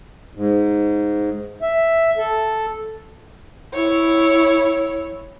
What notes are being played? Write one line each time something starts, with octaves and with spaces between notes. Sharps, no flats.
G#2
E5
A4
E4 C#5